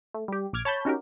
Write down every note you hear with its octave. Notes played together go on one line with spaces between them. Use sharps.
A3
G3 G4
A#1 D6 F6 G#6
C#5 A5 B5 G6
C#4 D#4 F#4 G4 A#4